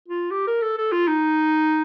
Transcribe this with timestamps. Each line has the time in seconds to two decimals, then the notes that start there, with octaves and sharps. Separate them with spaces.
0.08 F4
0.31 G4
0.47 A#4
0.62 A4
0.78 A4
0.92 F4
1.08 D#4